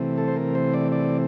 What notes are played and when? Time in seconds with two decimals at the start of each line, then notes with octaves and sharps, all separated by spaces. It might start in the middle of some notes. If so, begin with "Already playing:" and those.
Already playing: C3 E3 A3 C4
0.18 A4
0.28 C5
0.36 A#4
0.55 C5
0.74 D5
0.92 D5